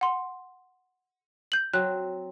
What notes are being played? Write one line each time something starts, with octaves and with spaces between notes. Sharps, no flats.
F#5 C6
G6 F#7
F#3 C4 F#6